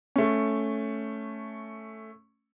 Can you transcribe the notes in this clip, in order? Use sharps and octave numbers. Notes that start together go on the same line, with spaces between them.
A3 C#4